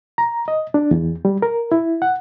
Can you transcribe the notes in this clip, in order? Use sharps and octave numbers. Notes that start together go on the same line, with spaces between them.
A#5
D#5
D4
E2
G3
A#4
E4
F#5